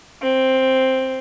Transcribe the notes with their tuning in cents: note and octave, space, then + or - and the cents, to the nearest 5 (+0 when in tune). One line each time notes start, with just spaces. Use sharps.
C4 +5